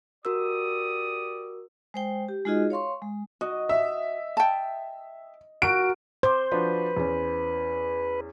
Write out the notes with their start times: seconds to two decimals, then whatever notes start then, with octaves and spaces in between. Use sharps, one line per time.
0.25 F#4 G4 A#4 D5 D#6 E6
1.94 G#3 C5 G5
2.29 G4
2.45 G#3 D#4 F4 F#4 G#4 D#5
2.70 C#5 F5 C6 C#6
3.02 G#3
3.41 F#4 D#5
3.69 E5
4.37 G5 A5
5.62 F#4 A#4 D7
6.23 C5 D6 G6
6.52 F3 D4 F#4 B4
6.97 E2 C#4